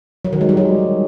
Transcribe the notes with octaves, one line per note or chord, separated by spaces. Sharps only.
F#3
D#3
G#3
G3
F#3